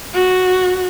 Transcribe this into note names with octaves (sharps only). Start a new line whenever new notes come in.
F#4